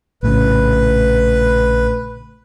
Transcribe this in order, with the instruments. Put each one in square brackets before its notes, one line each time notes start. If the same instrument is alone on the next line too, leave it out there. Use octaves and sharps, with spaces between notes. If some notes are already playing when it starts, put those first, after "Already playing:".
[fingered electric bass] A#1 A2 C#3 [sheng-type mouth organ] B4